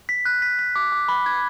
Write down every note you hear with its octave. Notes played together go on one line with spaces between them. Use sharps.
B6
F#6
B6
B6
D6
D6
B5
G#6